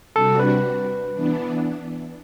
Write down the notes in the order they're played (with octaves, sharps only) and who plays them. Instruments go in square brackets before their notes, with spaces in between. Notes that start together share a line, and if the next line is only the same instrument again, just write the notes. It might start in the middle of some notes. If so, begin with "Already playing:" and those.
[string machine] C3 G3 D4 F#4 [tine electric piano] A4
[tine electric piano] B4
[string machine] E3 B3 D4